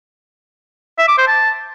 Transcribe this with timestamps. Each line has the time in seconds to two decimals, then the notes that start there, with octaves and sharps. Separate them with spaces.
0.98 E5
1.08 D6
1.18 C5
1.28 A5